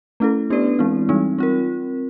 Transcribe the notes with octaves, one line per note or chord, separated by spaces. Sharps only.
A3 C#4 E4 A4
B3 D4 G4 B4 D5
E3 G#3 C4 E4
E3 G3 C4 D#4
C4 F4 A#4